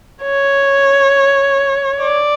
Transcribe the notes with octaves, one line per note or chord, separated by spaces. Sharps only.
C#5
D5